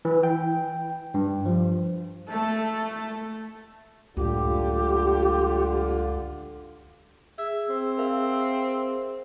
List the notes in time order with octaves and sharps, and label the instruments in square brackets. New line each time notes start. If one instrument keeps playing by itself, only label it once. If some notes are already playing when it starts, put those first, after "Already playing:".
[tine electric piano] E3
G5
G2
F3
[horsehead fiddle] A3 A4
[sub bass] C#2 [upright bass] F#2 A2 [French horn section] D3 F4 [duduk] G4
[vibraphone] G#4 [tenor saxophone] E5
[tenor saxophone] C4
[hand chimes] A#4 E5 F5